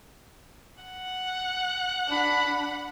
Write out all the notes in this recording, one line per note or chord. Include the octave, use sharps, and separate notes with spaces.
F#5
D4 B5